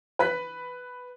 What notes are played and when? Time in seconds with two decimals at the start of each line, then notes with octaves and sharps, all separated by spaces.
0.19 B4 F#6 B6